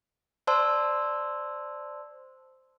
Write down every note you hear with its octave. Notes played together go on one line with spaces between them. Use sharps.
C5 D5 A5 C6 E6